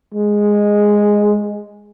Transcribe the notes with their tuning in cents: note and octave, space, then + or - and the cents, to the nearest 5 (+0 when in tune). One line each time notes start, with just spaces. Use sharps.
G#3 -5